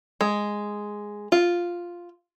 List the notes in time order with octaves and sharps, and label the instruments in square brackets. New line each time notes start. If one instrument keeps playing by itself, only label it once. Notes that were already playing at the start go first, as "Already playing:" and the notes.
[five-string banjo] G#3
F4